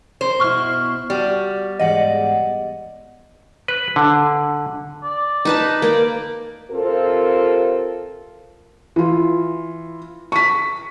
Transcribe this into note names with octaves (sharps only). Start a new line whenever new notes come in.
A#4 C5
B2 E4 C#6 F6
G3 F#4
E2 G#2 D5 D#5 F#5
B4
D3
D5
D#4 B4 A5
A#3 D5
C3 C4 F4 A4 A#4
E3 F4
C#6 B6